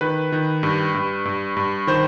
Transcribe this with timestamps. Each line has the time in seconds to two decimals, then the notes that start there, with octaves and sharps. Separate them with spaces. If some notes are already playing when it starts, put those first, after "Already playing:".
0.01 D#3 B4
0.32 D#3
0.63 G2
0.94 G2
1.25 G2
1.57 G2
1.87 D#3 C5